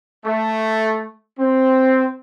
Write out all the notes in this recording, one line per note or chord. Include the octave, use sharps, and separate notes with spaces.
A3
C4